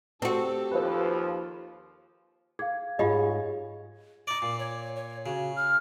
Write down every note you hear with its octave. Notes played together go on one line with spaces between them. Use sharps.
C4 F#4 G4 A4 A5
D#2 F3 F4 B4 C5
G#4 F5 G#6
G#2 F4 G4 G#4 C#5 D#5
D#4 D5 D6
A#2
C#5
C#5
C#3 F#4
F6